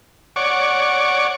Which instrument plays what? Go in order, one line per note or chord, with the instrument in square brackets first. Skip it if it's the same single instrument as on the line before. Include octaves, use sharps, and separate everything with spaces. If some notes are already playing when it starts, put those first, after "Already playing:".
[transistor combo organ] C#5 D5 F#5 C#6 D6